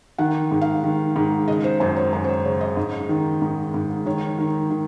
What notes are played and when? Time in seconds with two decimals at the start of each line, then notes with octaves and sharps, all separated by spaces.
0.18 D#3 F#5
0.51 G#2
0.61 F5
0.84 D#3
1.16 G#2
1.48 C#3 D#5
1.64 C5
1.80 F#2 C5
1.96 C#5
2.13 F#2 C5
2.24 C5
2.29 C#5
2.44 C#3 C#5
2.61 D#5
2.77 G#2
3.09 D#3
3.42 G#2
3.74 G#2
4.06 D#3 C#5
4.38 D#3
4.70 D#3